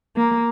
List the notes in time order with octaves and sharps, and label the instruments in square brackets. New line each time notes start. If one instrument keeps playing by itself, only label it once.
[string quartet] A#3